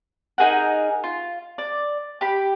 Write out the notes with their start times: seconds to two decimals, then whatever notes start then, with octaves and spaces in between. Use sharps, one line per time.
0.38 D#4 G#4 A#4 F#5
1.04 F4
1.58 D5
2.21 G4 B5